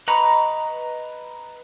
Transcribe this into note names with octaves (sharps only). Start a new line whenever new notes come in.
B4 D#5 A#5 B5 C#6